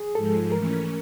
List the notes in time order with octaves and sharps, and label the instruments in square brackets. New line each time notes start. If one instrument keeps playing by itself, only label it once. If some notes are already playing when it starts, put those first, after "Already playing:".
Already playing: [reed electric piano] G#4
[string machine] G#2 F3 G#3 [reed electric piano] A4
[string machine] E3 A3 C#4 [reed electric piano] A#4